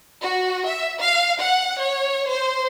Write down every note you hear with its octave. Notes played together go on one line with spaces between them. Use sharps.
F#4
E5
F5
F#5
C#5
C5